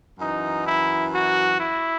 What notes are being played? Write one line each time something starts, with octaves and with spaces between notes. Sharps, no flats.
F#2 E3 D#4
E4
F#4
E4